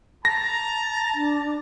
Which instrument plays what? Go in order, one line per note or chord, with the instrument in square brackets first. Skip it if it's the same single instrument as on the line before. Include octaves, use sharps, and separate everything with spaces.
[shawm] A5 [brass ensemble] A#5 [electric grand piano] A#6
[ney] D4